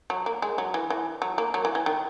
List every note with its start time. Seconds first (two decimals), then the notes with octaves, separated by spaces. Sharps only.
0.10 F#3
0.26 A#3
0.42 G#3
0.58 F#3
0.74 E3
0.90 E3
1.22 F#3
1.38 A#3
1.54 F#3
1.65 E3
1.75 E3
1.86 D#3